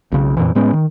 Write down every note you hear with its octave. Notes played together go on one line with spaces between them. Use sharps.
B1 C#3
F2 A#2 E3
A2 G#3 B3 C#4
D#3